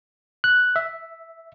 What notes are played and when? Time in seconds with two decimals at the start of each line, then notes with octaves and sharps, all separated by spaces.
0.44 F#6
0.76 E5